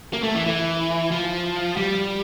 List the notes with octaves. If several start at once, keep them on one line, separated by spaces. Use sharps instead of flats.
A#3
A3
E3
E3
F3
G3